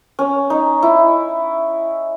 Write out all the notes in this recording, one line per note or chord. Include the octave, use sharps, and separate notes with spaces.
C#4
D#4
E4